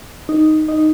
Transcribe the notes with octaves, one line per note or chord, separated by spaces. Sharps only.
D#4
D#4